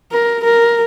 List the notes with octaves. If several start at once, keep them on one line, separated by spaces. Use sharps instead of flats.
A#4
A#4